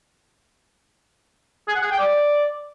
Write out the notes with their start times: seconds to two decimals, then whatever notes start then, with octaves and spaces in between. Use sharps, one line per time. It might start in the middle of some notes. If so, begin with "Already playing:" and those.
1.68 G#4
1.75 F#5
1.83 G#4
1.91 G5
1.98 D5